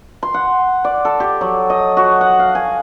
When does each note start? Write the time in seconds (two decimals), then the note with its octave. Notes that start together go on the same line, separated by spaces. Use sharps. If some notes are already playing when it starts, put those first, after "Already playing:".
0.23 C6
0.34 F#5
0.84 D5
1.05 A4
1.20 G4
1.41 F#3
1.70 D#5
1.97 F#4
2.21 F#5
2.39 F5
2.55 G#5